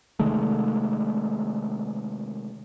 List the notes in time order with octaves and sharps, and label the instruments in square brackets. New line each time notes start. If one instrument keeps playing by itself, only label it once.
[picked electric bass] C3 D#3 G#3 A3